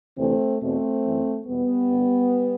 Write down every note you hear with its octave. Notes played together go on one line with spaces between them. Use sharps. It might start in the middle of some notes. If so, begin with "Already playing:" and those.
D2 C3 E3 A3 C4
E2 B2 A3 C4
F#2 E3
E2 B2 G3 B3
G2 D3